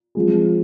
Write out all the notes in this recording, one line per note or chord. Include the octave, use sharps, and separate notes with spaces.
F3 G#3 C4 F4 G#4